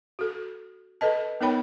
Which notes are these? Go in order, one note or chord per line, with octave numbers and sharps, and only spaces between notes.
F#4 A4
A4 B4 D#5 A5
B3 D#4 A#4 C#5 G5 B5